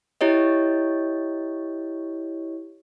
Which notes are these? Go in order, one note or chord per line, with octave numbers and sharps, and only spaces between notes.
E4 G4 C#5 D#5